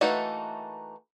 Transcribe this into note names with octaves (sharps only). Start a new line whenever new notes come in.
E3 A3 A#3 D#4 F#4